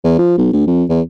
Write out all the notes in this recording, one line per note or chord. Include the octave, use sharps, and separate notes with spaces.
E2
F3
B1
D2
F2
E2